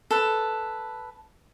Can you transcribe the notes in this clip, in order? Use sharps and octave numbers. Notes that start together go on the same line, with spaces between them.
A4 B4